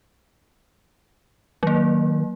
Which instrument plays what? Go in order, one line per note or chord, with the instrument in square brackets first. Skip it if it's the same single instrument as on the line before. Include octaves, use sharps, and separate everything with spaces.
[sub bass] D#3 [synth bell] F#3 A#3